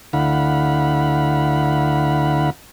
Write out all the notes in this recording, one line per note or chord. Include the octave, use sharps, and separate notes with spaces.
D2 D3 E4 F5 F#5 B5